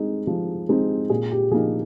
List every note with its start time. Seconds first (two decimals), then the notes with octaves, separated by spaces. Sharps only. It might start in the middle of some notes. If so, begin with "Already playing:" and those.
Already playing: G#3 C4 D#4
0.27 F3
0.69 G#3 C4 D#4
1.10 A#2 G#4
1.31 G4
1.51 F3 A#3 D#4 G#4